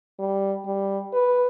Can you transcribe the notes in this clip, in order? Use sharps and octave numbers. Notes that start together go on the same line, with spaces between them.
G3
G3
B4